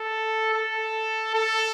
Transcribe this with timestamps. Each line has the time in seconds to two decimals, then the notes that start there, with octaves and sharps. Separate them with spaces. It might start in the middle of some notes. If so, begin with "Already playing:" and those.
Already playing: A4
0.54 A4
1.34 A4